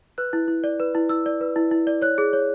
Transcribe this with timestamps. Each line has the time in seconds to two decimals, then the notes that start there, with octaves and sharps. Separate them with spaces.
0.18 B4 F#6
0.33 E4
0.48 E4
0.64 D5
0.80 B4
0.95 E4
1.09 E4 E6
1.26 D5
1.41 B4
1.56 E4
1.71 E4
1.87 D5
2.02 C#5 F#6
2.18 G#4
2.33 C#5